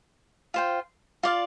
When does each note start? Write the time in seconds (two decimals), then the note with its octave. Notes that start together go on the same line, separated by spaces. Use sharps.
0.54 F4 C5 G5
1.23 F4 D5 F5